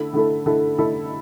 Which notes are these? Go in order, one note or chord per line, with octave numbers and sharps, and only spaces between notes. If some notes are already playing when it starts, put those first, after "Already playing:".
Already playing: D3 A3 E4 A4
D3 A3 E4 A4
D3 A3 E4 A4
D3 A3 E4 A4